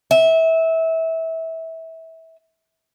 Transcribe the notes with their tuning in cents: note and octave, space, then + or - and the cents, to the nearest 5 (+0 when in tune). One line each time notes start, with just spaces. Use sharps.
E5 -20